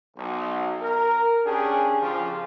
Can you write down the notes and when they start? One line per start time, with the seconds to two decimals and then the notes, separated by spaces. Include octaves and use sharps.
0.17 B1
0.81 A#4
1.46 C#4 D4 G4 G#4
2.01 F2 C#3 F3 F4 G4